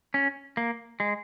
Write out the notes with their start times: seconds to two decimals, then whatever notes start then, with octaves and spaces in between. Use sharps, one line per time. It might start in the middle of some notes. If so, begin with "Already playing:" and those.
0.14 C#4
0.57 A#3
1.00 G#3